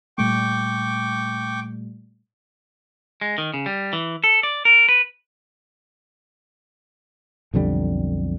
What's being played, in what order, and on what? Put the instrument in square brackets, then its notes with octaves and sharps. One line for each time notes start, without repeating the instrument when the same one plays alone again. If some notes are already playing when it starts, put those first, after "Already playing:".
[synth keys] A#2 G3 A3 [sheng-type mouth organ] G5 C#6 D6
[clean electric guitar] G#3
D#3
C#3
G3
E3
A4
D5
A#4
B4
[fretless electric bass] B1 F2 D3 G3